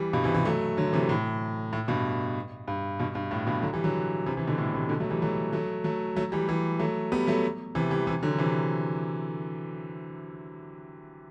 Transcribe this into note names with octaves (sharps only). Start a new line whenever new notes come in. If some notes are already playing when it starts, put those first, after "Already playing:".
Already playing: E3 G3
G2 B2
C3 E3
C3 E3
F#3 A3
D3 F#3
C3 E3
A2
A2
G2 B2
G2
G2 B2
G2
A2
G2 B2
D3 F#3
E3 G3
D3 F#3
C3 E3
C3 E3
B2 D3
A2
A2 C3
B2 D3
F#3 A3
E3 G3
F#3 A3
F#3 A3
F#3 A3
F#3 A3
E3 G3
E3 G3
F#3 A3
G3 B3
F#3 A3
C3 E3
E3 G3
C3 E3
D3 F#3
C3 E3